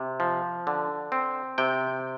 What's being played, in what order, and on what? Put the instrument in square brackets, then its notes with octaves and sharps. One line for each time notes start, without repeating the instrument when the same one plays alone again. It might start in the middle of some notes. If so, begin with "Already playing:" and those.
Already playing: [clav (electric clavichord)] C3
F3
D3
C4
C3 G5